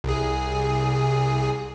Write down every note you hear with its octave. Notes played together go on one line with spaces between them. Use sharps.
C2 G#4